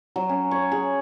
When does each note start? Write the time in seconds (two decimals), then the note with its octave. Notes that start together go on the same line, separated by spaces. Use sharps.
0.16 F#3
0.29 C#4
0.51 C#5
0.72 G#4